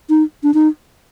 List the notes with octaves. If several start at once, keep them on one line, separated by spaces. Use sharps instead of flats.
D#4
D4
D#4